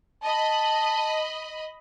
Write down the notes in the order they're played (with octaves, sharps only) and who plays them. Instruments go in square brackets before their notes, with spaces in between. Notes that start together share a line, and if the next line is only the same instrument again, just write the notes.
[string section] D#5 B5 [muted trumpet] A5